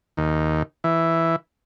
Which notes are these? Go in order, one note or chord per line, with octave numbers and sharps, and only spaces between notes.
D#2
E3